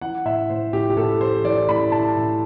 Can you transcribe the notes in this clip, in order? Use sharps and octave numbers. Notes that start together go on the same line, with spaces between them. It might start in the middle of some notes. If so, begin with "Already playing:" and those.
E3 F#5
A2 E5
A2 C5
A2 G4
G4
A2 A4
E3 C5
E3 D5
A2 B5
A2 A5
A2